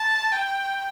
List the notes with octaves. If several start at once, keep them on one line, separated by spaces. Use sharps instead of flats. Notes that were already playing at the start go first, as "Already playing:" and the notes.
Already playing: A5
G5